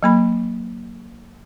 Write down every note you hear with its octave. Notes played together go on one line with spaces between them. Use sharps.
F#3 A#3 B5